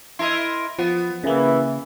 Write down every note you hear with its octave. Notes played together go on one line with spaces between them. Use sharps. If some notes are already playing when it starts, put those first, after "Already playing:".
E4 A#4 D#5 C6
F3 B3
C#3 E3 A#3